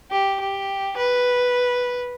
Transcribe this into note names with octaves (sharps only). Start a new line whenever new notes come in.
G4
G4
B4